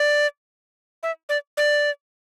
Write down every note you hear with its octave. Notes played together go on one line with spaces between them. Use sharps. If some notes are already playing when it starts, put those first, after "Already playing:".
Already playing: D5
E5
D5
D5